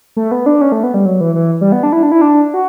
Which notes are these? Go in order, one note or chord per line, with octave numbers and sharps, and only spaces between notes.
A3
B3
D4
C#4
A3
B3
G3
F#3
E3
E3
G3
B3
D4
E4
D4
E4
D4
F#4